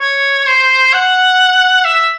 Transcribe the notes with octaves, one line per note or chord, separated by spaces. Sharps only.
C#5
C5
F#5
E5